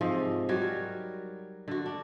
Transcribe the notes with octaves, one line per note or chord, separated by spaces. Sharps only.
G#2 C3 F3 D#5
F#3 G3 F#4 C#5
A#4
D3 F#4
D4